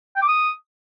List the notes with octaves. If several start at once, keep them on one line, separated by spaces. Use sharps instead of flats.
G5
D6
D#6